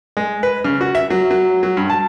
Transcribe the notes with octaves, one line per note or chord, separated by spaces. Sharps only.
G#3
B4
C#3
F#4
E5
F#3
F#3
F#3
G2
A5